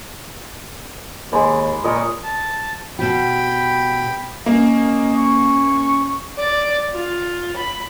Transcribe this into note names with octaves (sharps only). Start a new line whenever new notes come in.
D#2 G#3 B5 D6
A#2 A#4 C#5 D#5
A5
B2 G4 G5 B5
A#3 C#4 D#5
C#6
D5
F4
B5